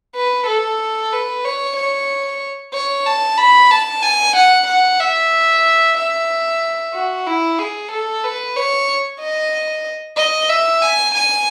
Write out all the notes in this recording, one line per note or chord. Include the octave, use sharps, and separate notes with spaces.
B4
A4
B4
C#5
C#5
C#5
A5
B5
A5
G#5
F#5
F#5
E5
E5
F#4
E4
G#4
A4
B4
C#5
D#5
D#5
E5
G#5
G#5